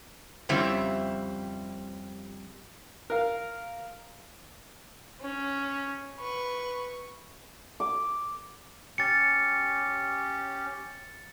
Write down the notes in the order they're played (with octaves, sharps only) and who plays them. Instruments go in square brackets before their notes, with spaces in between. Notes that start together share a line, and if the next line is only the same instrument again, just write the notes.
[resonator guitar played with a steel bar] F2 C#3 G3 C4 E4
[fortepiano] A#4 F5
[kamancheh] C#4
B4 C#6
[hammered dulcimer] D6
[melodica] C#4 G4 [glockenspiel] A6 C#7